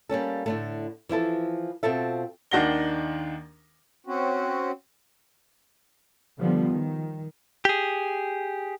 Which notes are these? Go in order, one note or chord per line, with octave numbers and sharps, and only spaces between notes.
G3 A#3 C#4 A4
A2 D3 A3
E3 F3 E4 A4
B2 C4 F4 A4 E5
D#2 D#3 D4 F#5 A#6 G7
C4 C#4 F#4
D3 F3 G3 B3
D#3
G4 G#4